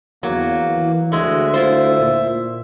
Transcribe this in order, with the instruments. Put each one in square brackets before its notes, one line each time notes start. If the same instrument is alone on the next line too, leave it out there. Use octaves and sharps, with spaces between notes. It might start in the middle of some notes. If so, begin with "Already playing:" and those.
[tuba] E2 [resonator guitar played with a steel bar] F#3 [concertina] A#3
[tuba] E3
[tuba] D2 [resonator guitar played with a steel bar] F#3 G#3 [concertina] E5
[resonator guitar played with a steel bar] E4 F4 C5
[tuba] A#2